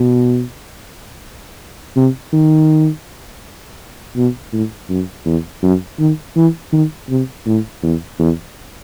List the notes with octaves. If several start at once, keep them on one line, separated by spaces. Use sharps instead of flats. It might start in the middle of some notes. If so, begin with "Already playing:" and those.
Already playing: B2
C3
D#3
B2
A2
F#2
E2
F#2
D#3
E3
D#3
C3
A2
E2
E2